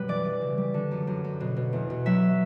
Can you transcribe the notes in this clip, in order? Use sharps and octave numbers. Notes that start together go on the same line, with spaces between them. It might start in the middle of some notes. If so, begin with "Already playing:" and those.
Already playing: F#2 B2 G3 B4
E3 D5
E3
C#3
G3
D3
F#2
F#2
F#2
B2
B2
E2
B2
F#3 E5